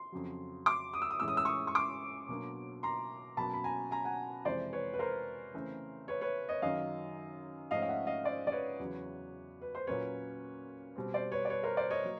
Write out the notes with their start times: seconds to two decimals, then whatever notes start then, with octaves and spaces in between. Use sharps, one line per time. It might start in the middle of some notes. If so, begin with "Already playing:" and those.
Already playing: C6
0.12 F2 C#3 F#3
0.66 C6 D6
0.94 D#6
1.02 E6
1.11 D#6
1.20 A2 E3 G#3 C#4 E6
1.28 D#6
1.37 E6
1.45 C#6 D#6
1.67 C#6
1.75 C6 D6
2.28 B2 F#3 A#3 D4
2.83 A#5 C6
3.37 B2 F#3 A#3 C#4 A5 B5
3.54 B5
3.64 G#5 A#5
3.91 G#5 A#5
4.05 F#5 G#5
4.45 F2 C3 E3 G#3 C5 D5
4.73 B4 C#5
4.94 B4
4.99 A#4 C5
5.54 C#3 E3 A3 C4
6.08 B4 C#5
6.21 B4 C#5
6.49 C#5 D#5
6.62 F#2 D#3 F#3 D#5 F5
7.71 G#2 F3 A3 C#4 D#5 F5
7.82 F5
7.89 E5 F#5
8.07 D#5 F5
8.24 C5 D5
8.47 D5
8.52 B4 C#5
8.79 E2 C#3 F#3
9.62 B4
9.75 C5
9.87 A#2 F#3 A#3 C#4 B4 C#5
10.96 B2 G3 C4
11.14 C5 D5
11.32 B4 C#5
11.45 D5
11.50 B4 C#5
11.64 A#4 C5
11.77 C5 D5
11.90 C#5 D#5
12.04 F#3 A#3